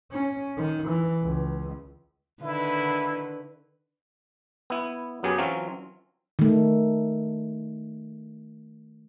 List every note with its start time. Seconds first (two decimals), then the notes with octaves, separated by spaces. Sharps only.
0.12 C#4
0.57 D#3
0.89 E3
1.22 C#2
2.42 D3 D#3 E4 B4
4.70 B3 E4
5.23 F#2 F#3 B3 G4 G#4
5.38 E3 F#3 C4 C#4 F4
6.39 D#3 A3